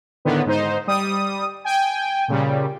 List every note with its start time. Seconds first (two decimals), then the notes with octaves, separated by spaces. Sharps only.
0.25 A2 D3 D#3 B3
0.46 G#2 D#4 C5
0.87 G3 D#6
1.65 G5 G#5
2.28 A#2 C#3 G3